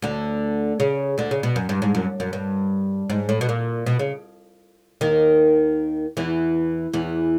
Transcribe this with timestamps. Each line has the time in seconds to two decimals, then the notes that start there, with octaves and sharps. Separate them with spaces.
0.02 D2 D3
0.80 C#3
1.18 D2 D3
1.31 C#3
1.43 B2
1.56 F#2
1.69 G2
1.82 G#2
1.95 F#2
2.20 F#2
2.33 G2
3.10 G#2
3.29 A2
3.41 B2
3.49 A#2
3.86 B2
3.99 C#3
5.01 D#2 D#3
6.17 E2 E3
6.93 E2 E3